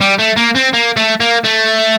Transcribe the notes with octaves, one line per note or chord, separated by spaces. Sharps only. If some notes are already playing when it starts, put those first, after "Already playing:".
G3
A3
A#3
C4
A#3
A3
A#3
A3